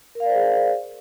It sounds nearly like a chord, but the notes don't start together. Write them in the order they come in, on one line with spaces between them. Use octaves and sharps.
A#4 F5 D5 C5 G#4